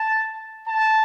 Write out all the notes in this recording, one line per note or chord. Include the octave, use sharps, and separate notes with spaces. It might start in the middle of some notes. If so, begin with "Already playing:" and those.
Already playing: A5
A5